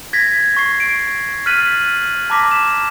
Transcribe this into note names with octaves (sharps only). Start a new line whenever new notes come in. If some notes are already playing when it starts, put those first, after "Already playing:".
G#6 A#6 B6
C#6 A6 C7
D7
F6 F#6 A6 B6 D#7 F#7
A5 A#5 D6 A#6 B6
E7